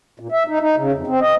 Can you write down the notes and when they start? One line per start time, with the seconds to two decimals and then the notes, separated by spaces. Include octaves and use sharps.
0.20 A#2
0.32 E5
0.47 D#4
0.60 D#4
0.77 C#3
0.92 F2
1.07 C4
1.21 D#5